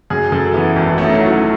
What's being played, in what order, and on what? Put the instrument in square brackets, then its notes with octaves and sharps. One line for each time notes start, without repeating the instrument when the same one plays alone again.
[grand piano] F#2 [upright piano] G#4
[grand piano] F#2 [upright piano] A4
[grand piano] E3 [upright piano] B3
[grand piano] G#1
[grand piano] A3 [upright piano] C#4
[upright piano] D#4
C#4
[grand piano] F#3 [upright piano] E4
[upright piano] F#4